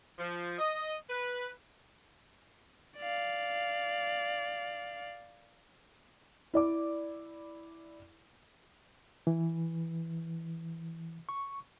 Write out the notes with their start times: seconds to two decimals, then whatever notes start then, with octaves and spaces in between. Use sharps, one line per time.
0.19 F3
0.59 D#5
1.10 B4
2.98 D5 F5
6.54 E4 D5 D6
9.27 E3
11.29 C#6